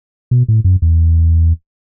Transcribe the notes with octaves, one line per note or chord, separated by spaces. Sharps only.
B2
A2
F#2
E2